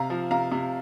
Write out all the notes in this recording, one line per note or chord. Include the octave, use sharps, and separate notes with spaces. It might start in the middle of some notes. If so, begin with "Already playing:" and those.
Already playing: C3 F5 A#5
F3
C3 F5 A#5
C3